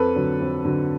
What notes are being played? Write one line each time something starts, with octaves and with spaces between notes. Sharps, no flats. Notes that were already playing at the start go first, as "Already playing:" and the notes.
Already playing: F2 A4 B4
D3 F#3
F2
D3 F#3